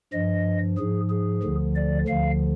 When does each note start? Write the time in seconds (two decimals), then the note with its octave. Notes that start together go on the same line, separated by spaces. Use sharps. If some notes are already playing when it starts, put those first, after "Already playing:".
0.13 G2 F3 D#5
0.78 G#2 F3 G#4
1.10 G#4
1.43 D2 D3 F3
1.75 D5
2.08 D2 D3 F3 F5